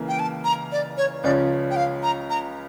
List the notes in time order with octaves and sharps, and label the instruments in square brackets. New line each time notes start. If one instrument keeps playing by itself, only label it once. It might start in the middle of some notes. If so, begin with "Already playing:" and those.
Already playing: [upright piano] C#2 C#3 E3 A#3
[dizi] G5
A5
A#5
D5
C#5
[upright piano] C#2 C#3 F3 C#4 [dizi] D5
[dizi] G5
F5
A#5
A#5